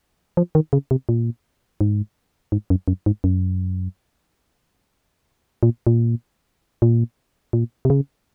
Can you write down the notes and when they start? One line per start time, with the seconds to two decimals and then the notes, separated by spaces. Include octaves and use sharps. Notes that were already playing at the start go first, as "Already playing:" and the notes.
0.37 F3
0.55 D#3
0.73 C#3
0.91 C3
1.09 A#2
1.81 G#2
2.52 G#2
2.70 F#2
2.88 F#2
3.06 G#2
3.24 F#2
5.63 A#2
5.87 A#2
6.82 A#2
7.53 A#2
7.85 C3
7.90 C#3